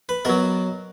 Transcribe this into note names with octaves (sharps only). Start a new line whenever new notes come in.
B4
B2 F#3 A#4